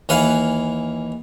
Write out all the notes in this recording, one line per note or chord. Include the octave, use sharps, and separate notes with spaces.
D#2 E3 F5 F#5 G#5 B5